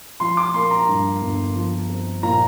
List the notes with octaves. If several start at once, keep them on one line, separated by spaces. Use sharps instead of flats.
F3 C6
D6
A#3 C6
A#5
G2
G1
F3
C4
A#2 A#5